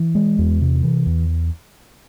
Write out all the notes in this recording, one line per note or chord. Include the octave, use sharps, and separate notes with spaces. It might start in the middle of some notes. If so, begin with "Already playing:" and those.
Already playing: E3
G#3
E2
C3
E3
E2